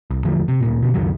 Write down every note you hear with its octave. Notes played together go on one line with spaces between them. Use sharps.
C2
E2 D3 F3 A3
C3
D1 G1 A#2
B2 D3 B3
C#2 F#2 D#3 F#3